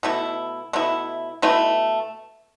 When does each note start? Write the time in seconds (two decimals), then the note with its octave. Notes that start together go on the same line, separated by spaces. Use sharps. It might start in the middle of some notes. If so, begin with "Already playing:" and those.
0.03 B2 A3 E4
0.73 B2 A3 E4
1.42 B2 A3 E4 B4